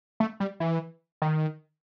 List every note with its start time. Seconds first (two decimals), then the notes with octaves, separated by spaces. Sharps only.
0.20 A3
0.40 G3
0.60 E3
1.22 D#3